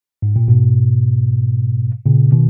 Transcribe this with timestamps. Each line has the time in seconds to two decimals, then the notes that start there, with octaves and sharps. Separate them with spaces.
0.22 G#2
0.36 A#2
0.48 G#2 B2
2.06 A#2 C#3
2.32 B2 D#3